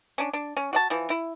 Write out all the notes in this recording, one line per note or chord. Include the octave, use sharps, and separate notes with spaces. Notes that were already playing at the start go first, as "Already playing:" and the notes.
C#4 D4
D4
C#4
F#4 D5 A5
E3 F3
E4